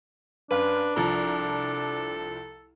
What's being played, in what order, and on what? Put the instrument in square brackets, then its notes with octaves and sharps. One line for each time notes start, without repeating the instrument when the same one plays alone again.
[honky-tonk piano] F#2 F5 [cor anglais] D4 [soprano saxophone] B4
[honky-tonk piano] C2 F3 A#5 [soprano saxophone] A4